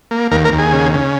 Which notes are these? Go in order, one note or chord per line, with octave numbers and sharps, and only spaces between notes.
A#3
D#2 A#3 A#4
A#3 A#4
D#2
G#4
C#3
C#3